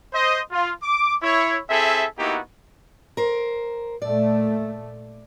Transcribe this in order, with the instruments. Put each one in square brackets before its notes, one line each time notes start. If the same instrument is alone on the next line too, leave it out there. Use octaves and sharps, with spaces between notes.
[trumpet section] C5 D#5
F4
D6
E4 C#5
C4 E4 G#4 A4 E5
A#3 B3 D#4 E4 F#4 G4
[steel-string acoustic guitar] A#4 C5
[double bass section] A#2 A3 [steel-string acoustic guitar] D5